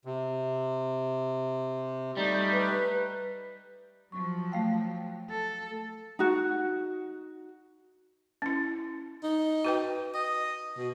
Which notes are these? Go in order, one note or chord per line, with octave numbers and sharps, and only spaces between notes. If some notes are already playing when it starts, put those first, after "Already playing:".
C3
G3 A3 D#4
B4
F3 F#3 C#6
A3 F5 G5
A4
D#4 F#4
C#4 E4
D#4
F#4 B4 G5
D#5
B2